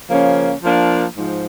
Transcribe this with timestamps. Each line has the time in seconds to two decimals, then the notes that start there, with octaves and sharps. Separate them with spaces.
0.09 C#3 F3 A#3 C#4
0.63 F3 A#3 D4
1.15 G#2 F3